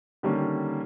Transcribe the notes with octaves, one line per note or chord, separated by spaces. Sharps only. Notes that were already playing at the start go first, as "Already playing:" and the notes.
D3 D#3 G3 A#3 C#4